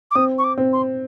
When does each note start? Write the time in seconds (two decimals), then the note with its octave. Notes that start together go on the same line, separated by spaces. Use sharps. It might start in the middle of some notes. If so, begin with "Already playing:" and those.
0.11 D6
0.15 C4 D#6
0.38 C#6
0.44 D6
0.58 C4
0.72 C6